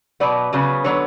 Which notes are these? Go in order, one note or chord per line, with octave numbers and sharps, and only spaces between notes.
B2 F#3 B3 D5
C#3 F#3 B3
D3 F#3 B3 C#5